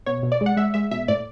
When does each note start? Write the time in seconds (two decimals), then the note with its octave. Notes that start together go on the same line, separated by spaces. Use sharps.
0.06 B2 C#5
0.23 B2
0.32 D5
0.41 G#3
0.46 F#5
0.57 G#3 E5
0.74 G#3 E5
0.91 B2 E5
1.08 A2 D5